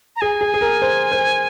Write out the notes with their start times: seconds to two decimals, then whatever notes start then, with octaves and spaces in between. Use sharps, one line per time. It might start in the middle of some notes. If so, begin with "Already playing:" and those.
0.16 A#5
0.21 G#4 G#5
0.41 G#4
0.54 G#4
0.61 A#4
0.82 C5
1.12 C5